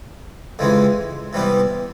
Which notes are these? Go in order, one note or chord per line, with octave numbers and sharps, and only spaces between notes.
F2 C#3 E3 G#3
C3 E3 G3 B3